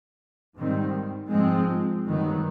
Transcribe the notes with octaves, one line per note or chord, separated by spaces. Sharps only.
G#2 D#3 G3 C4
G#2 F3 G#3 C4
G2 D#3 F#3 B3